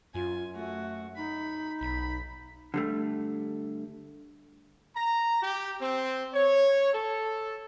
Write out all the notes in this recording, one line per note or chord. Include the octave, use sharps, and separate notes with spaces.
F#2 F4 G#5
A3 F#4
D#4 B5
B1 B5
D3 G3 A3
A#5
G4
C4
C#5
A4